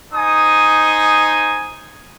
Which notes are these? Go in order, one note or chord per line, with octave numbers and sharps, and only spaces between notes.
D#4 C5 G#5 D#6